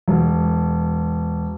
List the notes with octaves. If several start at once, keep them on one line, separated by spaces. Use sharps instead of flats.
E1